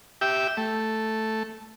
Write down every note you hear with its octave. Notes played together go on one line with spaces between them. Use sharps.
G4 E5 G5
A3